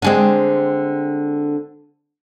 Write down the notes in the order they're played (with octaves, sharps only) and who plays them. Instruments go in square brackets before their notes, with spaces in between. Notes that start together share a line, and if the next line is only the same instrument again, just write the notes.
[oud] D3 G#3 C4